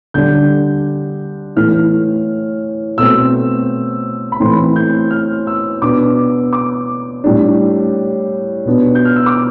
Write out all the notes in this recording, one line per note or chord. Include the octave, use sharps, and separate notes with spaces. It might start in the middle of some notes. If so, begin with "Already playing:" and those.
D3 G3 D4 G6
A2 E3 A3 F6
B2 A3 C4 E6
B5
A2 E3 A3 C4 C6
G6
F6
E6
B2 B3 D4 D6
D6
A2 G3 D4
B2 B3 D4
G6
F6
E6
D6